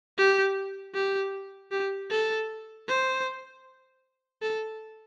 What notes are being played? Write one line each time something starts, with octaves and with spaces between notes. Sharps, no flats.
G4
G4
G4
A4
C5
A4